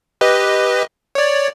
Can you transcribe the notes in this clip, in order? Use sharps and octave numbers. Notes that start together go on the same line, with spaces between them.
G4 B4 D#5
C#5 D5